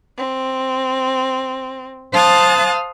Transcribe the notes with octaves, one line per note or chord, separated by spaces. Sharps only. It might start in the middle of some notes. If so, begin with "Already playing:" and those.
C4
C5 F5 A5 D#6 F#6 A6